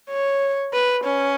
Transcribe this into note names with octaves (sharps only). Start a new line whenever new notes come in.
C#5
B4
C#4